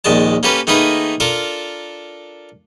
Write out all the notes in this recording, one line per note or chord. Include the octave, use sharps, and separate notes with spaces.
A#1 D#2 G#3 D5 A5
A#3 C#4 G4 A4 B4
D#3 A3 A#3 D#4 G#4 B4
D4 F4 A4 A#4